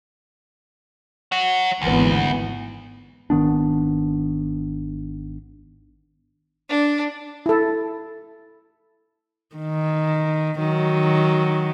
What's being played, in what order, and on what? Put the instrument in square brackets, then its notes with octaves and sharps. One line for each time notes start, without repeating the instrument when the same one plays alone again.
[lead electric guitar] C#5 F#5
[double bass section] G#1 E3 B3 [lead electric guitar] D2
[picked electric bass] G#1 D#3 B3 D4
[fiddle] D4
[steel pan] E4 A4
[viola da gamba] D#3
D#3 F#3